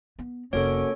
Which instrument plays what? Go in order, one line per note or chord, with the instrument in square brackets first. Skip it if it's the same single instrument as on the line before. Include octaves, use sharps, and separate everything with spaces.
[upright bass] B3
[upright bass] F1 E4 [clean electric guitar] A#3 F#4 [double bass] C#4 [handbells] A4 C#5